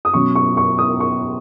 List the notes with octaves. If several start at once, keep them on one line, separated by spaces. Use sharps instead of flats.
D#6
B2 F#3 C#4 C#6
C#6
C#6
D#6
C#6